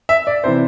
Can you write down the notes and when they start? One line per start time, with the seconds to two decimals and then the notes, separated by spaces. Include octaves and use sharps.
0.09 E5
0.27 D5
0.44 C3 E3 C5